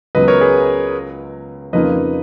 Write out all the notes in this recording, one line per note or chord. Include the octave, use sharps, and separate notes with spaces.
C#2 C#3 F#3 B3 B4 D#5
A#4 C#5
G#4 B4
F2 C#3 F3 A#3 D#4 B4 D#5